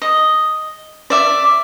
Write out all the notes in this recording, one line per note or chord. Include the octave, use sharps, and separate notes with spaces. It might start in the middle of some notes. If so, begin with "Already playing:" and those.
D#5
D5 E5